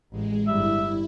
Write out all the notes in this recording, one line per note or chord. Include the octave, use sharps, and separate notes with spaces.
A1 G#3
G1 G3 E4 E5